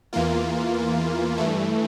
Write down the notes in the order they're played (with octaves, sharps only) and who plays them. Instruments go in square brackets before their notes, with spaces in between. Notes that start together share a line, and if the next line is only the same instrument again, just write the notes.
[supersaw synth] E2 E3 A#3 F4
G2 E3 A3